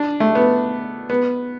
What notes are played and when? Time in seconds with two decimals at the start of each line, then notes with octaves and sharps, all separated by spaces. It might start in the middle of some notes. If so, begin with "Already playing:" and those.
Already playing: D4
0.20 A3
0.35 B3
1.10 B3